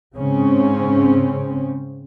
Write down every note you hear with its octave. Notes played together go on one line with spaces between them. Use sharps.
G#2 C#3 C4 C#4